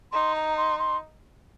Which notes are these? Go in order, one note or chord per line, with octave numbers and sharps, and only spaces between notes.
D#4 C6
A#5
C6
C6